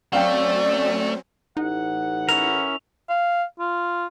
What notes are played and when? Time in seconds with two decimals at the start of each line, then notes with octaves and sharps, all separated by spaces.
0.13 F#3 A3 C4 C#4 D5 F5 G5
1.57 A1 D#4 F#5
2.29 C#4 E4 A#4 F7
3.09 F5
3.59 F4